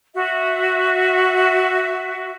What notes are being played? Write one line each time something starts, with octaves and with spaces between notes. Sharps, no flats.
F#4 E5